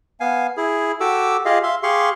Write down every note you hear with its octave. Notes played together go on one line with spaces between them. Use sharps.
B3 F5 G#5
E4 G#4
F#4 G4 A4 D6 E6
F4 G4 G#4 D#5 F5
E5 F5 C6
G4 G#4 F5 C6 C#6